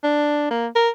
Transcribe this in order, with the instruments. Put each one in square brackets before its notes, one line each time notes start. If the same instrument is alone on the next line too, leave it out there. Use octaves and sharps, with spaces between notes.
[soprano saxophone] D4
A#3
A#4